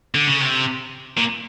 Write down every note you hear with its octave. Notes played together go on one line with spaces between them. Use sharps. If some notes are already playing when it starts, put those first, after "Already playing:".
D3
C#3
C3
A#2